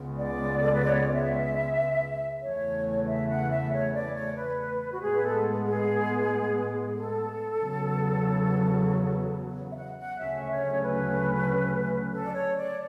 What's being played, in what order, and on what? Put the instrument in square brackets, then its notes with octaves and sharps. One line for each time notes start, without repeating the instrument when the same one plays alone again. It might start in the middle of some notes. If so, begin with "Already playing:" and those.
Already playing: [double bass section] C#2 C#3 G#3 B3
[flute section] D5
A4
B4
C#5
D5
E5
[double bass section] E2 C#3 E3 A3 [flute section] C#5
[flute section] E5
F#5
E5
C#5
D5
C#5
B4
F#4
[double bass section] A2 G#3 B3 [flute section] G#4
[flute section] B4
A4
G#4
A4
[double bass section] E2 C#3 F#3 B3
[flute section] E5
F#5
F#5
[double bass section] D2 C#3 F#3 A3 C#4 [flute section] E5
[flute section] C#5
B4
A4
D5
C#5
D5